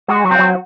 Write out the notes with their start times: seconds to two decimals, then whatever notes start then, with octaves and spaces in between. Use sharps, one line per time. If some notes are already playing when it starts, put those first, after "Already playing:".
0.08 G#3 F#4
0.24 F#3
0.31 C4
0.39 F#3